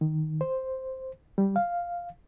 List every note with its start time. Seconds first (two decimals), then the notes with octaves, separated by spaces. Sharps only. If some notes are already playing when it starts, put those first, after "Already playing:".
0.01 D#3
0.41 C5
1.38 G3
1.56 F5